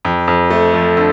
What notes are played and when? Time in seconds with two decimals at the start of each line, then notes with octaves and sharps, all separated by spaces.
0.05 F2
0.28 F2
0.51 A3
0.74 F3
0.97 D3